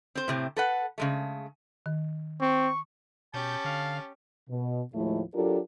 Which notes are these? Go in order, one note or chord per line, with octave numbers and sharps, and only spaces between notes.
C4 C5
A2 C3 C4
A4 B4 F#5
C#3 G#3 A3
D#3
C4 C#6
B2 C#4 G4 A5 G6
D3 F5
B2
D#2 A2 F3 G#3 A3 E4
F#3 D4 F4 G4 A4 A#4